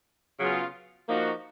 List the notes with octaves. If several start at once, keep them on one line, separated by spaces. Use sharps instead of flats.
C#3 F#3 B3 F4 G#4
F3 A#3 D#4 F#4